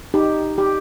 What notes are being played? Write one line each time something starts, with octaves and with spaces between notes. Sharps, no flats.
D#4 G4
G4